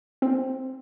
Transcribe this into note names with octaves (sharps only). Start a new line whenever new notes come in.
C4